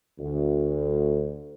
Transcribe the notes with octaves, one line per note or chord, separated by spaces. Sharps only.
D2